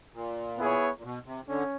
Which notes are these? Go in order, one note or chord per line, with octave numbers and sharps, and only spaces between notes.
A#2
B3 E4 G#4 C#5
A#2
B2
C3
D3 C#4